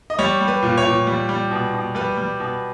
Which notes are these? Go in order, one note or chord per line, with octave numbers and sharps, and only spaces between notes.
D#5
G3 C#5
G3
B4
A#2
C#5
A#2
G3
G3
B2
B2
G3 B4
G3
B2